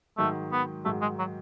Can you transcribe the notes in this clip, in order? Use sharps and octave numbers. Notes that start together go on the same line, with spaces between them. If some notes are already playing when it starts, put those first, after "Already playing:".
G#2 D#3 F#3 A3
B3
G#2 D#3 F#3 A3
G#3
F#3